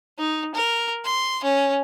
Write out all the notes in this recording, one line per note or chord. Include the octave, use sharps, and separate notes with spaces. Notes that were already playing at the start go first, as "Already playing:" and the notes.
D#4
A#4
C6
C#4